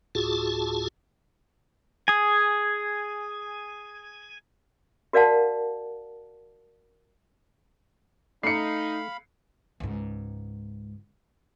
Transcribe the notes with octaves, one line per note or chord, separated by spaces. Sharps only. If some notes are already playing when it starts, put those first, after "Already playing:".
D2 A2 F4 F#4 G#4 A5
G#4 G#5
F#4 A#4 D5 F5 F#5 A5
A3 D#4 F5 B5 C7 C#7
C#2 G#2